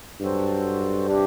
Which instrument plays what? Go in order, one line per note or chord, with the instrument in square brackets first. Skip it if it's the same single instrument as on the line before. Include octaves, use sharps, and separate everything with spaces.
[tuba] G2 [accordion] F#3 C4 F#4 A4 C5
[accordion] C3 G3 D4 G4